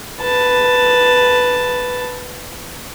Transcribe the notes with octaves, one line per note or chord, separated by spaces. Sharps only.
B4 A5